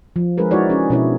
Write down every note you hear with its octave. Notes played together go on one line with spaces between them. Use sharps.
F3
G#3 D4 G#4 A#4 B4
G#3 D#4 E4 F#4 C#5 D5
C#4 G#4
B2 C#4 D4 E4 G#4 C#5